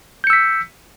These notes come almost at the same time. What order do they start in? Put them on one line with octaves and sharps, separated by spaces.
G6 C#7 E6 B6